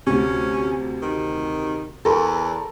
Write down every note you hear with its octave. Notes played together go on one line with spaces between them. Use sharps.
D2 C3 C#4
D#3
E2 A4 A#4